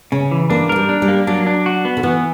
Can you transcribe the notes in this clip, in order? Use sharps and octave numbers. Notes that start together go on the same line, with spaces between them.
C#3 C#4
E3
A#3 D4
A#3 A#4
G3
D4
G3
A#3
F#3 D4
D4
F#4
B3
D3
E3 B3